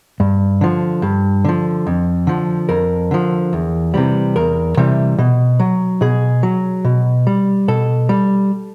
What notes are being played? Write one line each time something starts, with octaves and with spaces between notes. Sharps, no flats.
G2
D3 F3
G2
D3 F3
F2
D3 F3
F2 A#4
D3 F3
E2
C3 E3 G3
E2 A#4
C3 E3 G3
B2
F#3
B2 G#4
F#3
B2
G3
B2 A4
G3